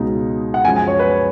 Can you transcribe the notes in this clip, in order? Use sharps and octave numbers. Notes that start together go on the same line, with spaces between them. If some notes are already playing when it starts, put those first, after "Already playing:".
Already playing: C#2 B2 G#3 D#4
F#5
F#2 F3 G#3 G#5
G#5
C#5
B4